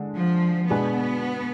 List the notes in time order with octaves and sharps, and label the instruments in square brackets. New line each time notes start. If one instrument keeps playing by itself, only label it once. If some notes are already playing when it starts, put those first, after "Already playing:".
Already playing: [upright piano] D3 G#3
[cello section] F3
[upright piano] B2 G#3 D4 G#4 B4 [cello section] B3